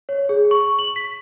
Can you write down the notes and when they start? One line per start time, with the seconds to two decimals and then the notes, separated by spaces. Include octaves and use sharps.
0.09 C#5
0.29 G#4
0.51 C#6
0.79 F#7
0.96 B6